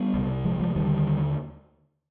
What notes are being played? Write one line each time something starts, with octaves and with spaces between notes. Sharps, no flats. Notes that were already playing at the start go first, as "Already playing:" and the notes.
Already playing: G3 B3
C2 C3
F3 G#3
F3 G#3
D#2 D3 D#3 G3